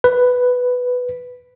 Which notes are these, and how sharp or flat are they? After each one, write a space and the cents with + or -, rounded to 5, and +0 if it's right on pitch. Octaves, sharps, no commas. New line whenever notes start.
B4 +5